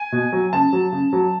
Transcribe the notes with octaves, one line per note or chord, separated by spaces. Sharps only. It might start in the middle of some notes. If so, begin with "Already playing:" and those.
Already playing: G#5
B2
F#3
C#3 A5
F#3
C#3
F#3